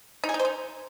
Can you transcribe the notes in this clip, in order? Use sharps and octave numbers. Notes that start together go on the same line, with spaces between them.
D#4
G#4
D#4
C5
D#4